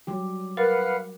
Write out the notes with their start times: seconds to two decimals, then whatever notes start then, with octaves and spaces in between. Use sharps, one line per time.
0.07 F#3 G3 G4
0.57 A#4 B4 F5 F#5